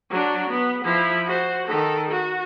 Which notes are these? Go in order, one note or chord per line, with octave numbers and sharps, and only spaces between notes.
F#3 D4
B3
F3 E4
F#4 C5
D#3 A4
F#4